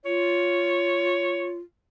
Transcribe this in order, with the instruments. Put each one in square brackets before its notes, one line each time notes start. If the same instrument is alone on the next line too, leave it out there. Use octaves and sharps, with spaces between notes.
[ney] F4 [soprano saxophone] C#5